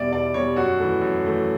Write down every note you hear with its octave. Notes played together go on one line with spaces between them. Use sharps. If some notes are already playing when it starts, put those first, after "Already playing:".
Already playing: E2 B2 G3 D5 E5
E2 D5
B2 G3 C#5
F#2 F#4
E3 A3
F#2
E3 A3